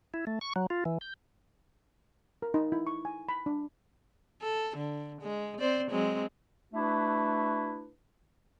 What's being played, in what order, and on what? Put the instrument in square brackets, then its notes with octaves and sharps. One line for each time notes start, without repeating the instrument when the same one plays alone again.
[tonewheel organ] E4
A3
C#6
F#3
F4
E3
G6
[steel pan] A#4
D#4
E4
C#6
G#5
B5
D4
[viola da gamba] A4
D3
G#3
C4 C5 D5
F#3 G#3 C4
[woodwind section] A3 D4 E4 F#4 B4